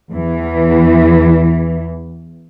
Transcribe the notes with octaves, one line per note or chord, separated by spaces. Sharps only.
E2 E3